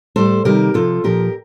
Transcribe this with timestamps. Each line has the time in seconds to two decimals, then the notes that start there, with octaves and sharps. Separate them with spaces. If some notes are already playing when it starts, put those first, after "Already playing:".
0.16 A2 G3 A4 C5
0.45 C3 D#3 G3 G4 A#4
0.74 C3 F3 F4 A4
1.04 A#2 F3 G4 A#4